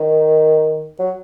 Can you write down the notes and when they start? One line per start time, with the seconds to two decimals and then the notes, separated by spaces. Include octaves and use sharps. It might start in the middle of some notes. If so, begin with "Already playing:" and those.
Already playing: D#3
0.99 F#3